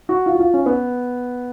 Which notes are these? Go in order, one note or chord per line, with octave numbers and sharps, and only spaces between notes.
F#4
F4
F#4
F4
C#4
B3